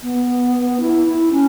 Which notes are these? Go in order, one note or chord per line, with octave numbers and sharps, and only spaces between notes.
B3
E4
E4
C#4